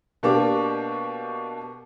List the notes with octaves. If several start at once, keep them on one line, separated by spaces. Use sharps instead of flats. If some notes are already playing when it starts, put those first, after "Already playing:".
B2 A#3 D4 G4 D6